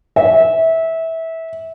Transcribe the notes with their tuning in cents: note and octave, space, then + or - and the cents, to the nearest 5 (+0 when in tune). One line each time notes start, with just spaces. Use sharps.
E5 -20